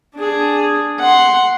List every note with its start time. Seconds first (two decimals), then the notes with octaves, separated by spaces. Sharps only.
0.16 D4 G#4
1.00 F#5 C6